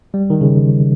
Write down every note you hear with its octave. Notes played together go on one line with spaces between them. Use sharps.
G3
D#3
C#3